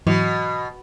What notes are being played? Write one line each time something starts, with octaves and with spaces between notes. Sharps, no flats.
G#2 B2 E3 F#3